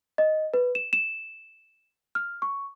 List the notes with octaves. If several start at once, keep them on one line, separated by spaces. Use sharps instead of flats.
D#5
B4
E7
E7
F6
C#6